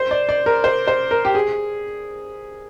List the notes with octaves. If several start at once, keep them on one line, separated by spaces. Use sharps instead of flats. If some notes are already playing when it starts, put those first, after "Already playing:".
Already playing: C5
D5
D5
A#4
C5
C5
A#4
G4
G#4